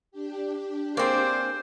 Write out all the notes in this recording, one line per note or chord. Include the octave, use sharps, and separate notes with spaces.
D4 G4
A#3 C4 G#4 C5 D5 C6